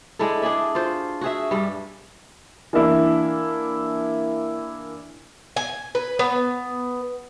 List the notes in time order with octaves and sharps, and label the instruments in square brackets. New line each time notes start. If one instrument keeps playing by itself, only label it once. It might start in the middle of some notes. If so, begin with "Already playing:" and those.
[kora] G#3 D4 E4 A4
D4 G#4 D5 E5
F4 F#4 C5
F#4 G#4 E5
G2 G3
[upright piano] E3 A#3 D4 E4
[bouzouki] G#5
B4
B3